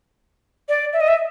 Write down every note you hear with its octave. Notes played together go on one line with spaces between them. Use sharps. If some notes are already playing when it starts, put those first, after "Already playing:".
D5
E5
D#5
E5